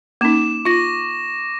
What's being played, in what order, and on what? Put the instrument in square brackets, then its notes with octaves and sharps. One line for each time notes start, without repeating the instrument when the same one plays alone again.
[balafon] A#3 C#4 D#4 [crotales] D6 E7
[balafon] F4 [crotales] C#6 A#6